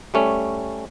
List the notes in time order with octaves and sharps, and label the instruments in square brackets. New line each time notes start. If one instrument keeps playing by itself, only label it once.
[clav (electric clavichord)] G3 A3 C#4